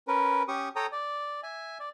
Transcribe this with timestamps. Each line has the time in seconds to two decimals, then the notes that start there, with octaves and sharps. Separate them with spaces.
0.08 C#4 A#4 B4
0.48 C#4 G4 C#6 D#6
0.76 A4 C#5 G5 A#5 D#6
0.92 D5
1.43 E5 G#5
1.80 D5